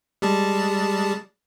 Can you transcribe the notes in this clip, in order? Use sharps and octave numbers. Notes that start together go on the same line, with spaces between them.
G3 G#3 A5